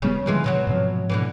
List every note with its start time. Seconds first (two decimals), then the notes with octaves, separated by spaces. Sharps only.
0.02 D#1 C#3 G3 B3
0.26 D#2 D3 E3 F3 G3 G#3
0.44 B2 F#3 F#4
0.67 G#2 C3 F3
1.10 B2 D3 E3